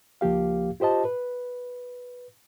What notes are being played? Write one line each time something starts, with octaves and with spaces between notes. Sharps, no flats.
C#2 F3 A#3 G4 F5
F4 G4 C5 D#5 A5
B4